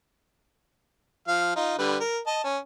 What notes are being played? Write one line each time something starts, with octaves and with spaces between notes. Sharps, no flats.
F3 F5
D#4 F4
D3 G3 B4
A#4
D#5 A5
C#4